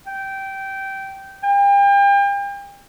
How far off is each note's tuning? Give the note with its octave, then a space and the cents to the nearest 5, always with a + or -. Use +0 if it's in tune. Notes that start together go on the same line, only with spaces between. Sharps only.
G5 -15
G5 +40